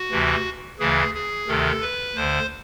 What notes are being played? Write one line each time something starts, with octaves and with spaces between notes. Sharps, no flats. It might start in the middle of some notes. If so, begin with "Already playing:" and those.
Already playing: F#4
D2 C3 E3
D2 C#3 E3 G#4
G#4
D2 C3 D#3 A4
B4
D2 D3 C5